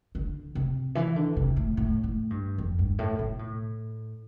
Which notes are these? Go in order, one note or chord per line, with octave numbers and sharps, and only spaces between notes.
D3
C3
E3
D3
C3
A2
A2
A2
G2
F2
G2
A2
B2
A2